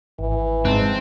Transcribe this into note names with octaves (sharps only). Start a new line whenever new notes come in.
G#1 E3
G#1 G#2 C4 A5 F#6